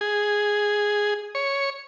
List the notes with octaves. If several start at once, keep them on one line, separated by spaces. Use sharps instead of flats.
G#4
C#5